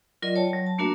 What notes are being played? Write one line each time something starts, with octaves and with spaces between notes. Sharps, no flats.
F#3 F4 A#4 D5 D#5
C#5 G5 A5
F#3
A5
A3 A#3 D4 F#4 A#4 E5